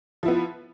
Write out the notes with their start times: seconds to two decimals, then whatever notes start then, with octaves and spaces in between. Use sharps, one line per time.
0.23 F3
0.25 E4
0.28 B3